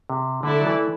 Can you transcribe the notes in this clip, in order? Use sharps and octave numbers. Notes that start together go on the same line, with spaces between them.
C3
D3 A3 E4 A4 D5
F#3
E3